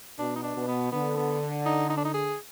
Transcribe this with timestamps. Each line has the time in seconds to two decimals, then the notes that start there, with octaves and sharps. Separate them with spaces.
0.18 B2 D4
0.36 D#4
0.43 D4
0.56 B2
0.68 B3
0.92 D3 B3
1.17 B3
1.66 D#4
1.90 D#4
1.97 D4
2.05 D#4
2.14 G#4